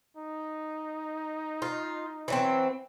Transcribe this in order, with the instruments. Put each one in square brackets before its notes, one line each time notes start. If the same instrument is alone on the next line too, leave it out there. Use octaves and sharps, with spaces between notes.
[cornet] D#4
[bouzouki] F4
E3 F#3 C4